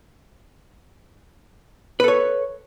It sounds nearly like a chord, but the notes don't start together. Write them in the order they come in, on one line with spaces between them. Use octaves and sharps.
B4 A4 C#5